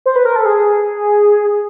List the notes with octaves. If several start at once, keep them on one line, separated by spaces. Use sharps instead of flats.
C5
B4
A#4
A4
G#4